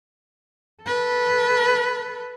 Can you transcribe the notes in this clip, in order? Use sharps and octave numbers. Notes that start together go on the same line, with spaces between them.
A4 B4